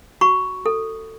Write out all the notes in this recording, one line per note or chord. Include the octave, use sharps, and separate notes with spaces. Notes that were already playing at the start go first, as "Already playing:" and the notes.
F#4 B5 C#6
A4